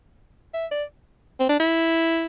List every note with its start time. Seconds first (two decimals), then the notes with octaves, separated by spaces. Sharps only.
0.54 E5
0.71 D5
1.40 C4
1.49 D4
1.60 E4